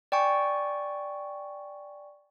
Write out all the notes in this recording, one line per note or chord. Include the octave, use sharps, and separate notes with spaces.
D5 G5 G#5 C#6